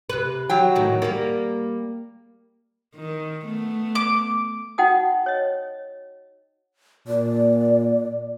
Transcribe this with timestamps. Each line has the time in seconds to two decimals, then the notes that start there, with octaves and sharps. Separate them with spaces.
0.10 C3 B4
0.49 F#3 G5
0.76 A2 D#3
1.02 G3 A#3 D5
2.96 D#3
3.45 A3 B3
3.95 D6
4.78 D#4 F#4 F#5 G5 A5 D#6
5.26 C#5 D#5
7.08 A#2 D5